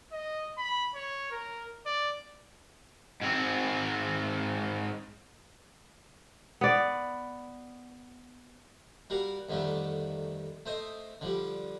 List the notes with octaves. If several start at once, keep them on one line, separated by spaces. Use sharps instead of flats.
D#5
B5
C#5
A#4
D5
G#2 C4
B3 D5
G3 F#4 A#4 F5
F2 D3 D#3 G3 A3
A3 C5 D#5
D3 F3 G3